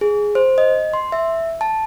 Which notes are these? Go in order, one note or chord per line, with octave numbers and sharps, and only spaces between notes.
G#4
C5
D#5
C6
E5
A5